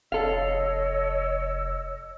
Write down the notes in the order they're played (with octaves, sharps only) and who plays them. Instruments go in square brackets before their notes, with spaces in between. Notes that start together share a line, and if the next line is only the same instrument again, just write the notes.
[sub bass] F1 [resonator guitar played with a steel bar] A4 F5 [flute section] C#5 D#5 E6